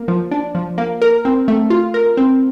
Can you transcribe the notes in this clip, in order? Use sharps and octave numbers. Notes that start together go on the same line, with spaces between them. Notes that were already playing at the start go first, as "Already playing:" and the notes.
Already playing: A#3
F3
D4
F3
A#3
A#4
C4
A3
F4
A#4
C4